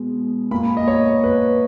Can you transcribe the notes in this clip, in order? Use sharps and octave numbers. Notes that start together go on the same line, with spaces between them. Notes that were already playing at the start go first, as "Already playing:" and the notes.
Already playing: B2 G#3 B3
A#2 A#3 B5
D#5
C#5
B4